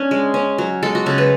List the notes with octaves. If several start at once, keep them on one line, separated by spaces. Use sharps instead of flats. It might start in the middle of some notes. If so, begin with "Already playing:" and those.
Already playing: C#4 D4
G#3
C#4
F#3
G#3 A4
F#4
C#3 A4
B4